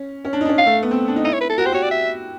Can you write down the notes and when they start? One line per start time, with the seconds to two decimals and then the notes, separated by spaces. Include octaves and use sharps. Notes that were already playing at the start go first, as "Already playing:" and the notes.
Already playing: C#4
0.25 C#4
0.33 D4
0.41 D#4
0.45 D4
0.49 C#4
0.58 F5
0.66 A3
0.83 B3
0.91 C4
1.08 D4
1.16 D#4
1.24 E4 D#5
1.33 C#5
1.41 B4
1.50 A4
1.58 F#4 A#4
1.65 G4 C5
1.72 F#4 C#5
1.83 D5
1.91 E5